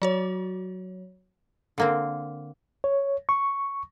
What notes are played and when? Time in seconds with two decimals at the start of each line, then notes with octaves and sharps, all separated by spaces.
0.02 F#3 F#4 C#5
1.78 D3 A#3 C4
2.84 C#5
3.29 C#6